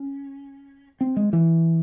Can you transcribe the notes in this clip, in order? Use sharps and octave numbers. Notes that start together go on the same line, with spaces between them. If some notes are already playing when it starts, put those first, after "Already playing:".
Already playing: C#4
C4
G#3
E3